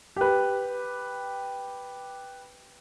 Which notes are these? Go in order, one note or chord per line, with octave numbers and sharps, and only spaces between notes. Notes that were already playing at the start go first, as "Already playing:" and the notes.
G4 B4